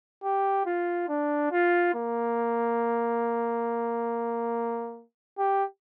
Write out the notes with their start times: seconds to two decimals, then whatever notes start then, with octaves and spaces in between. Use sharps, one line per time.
0.24 G4
0.66 F4
1.09 D4
1.52 F4
1.95 A#3
5.38 G4